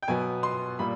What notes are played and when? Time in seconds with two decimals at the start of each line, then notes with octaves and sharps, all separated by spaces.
0.02 G5
0.08 B2 F#3 B3 G#5
0.43 C6
0.79 A#2 G3 A#3 B5